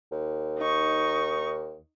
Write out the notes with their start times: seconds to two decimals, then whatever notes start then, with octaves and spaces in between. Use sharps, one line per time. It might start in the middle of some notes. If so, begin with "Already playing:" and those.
0.11 D#2
0.58 D#4 C#6